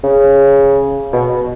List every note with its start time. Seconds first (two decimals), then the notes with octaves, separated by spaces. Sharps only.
0.04 C#3
1.13 B2